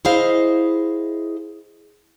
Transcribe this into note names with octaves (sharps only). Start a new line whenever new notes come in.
E4 G#4 C5 D#5 F5